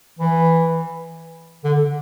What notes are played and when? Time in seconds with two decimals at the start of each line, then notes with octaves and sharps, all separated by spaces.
0.19 E3
1.64 D3